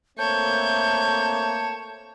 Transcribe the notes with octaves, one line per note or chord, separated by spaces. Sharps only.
A3 A#3 C4 C#5 A5 G6